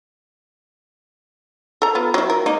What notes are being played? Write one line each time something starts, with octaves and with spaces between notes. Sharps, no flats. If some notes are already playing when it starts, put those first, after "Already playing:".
A4 A#5
B3 F4
F#3 E4
A#4
G#3 A#3 D#4